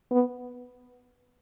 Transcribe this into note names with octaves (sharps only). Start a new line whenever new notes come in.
B3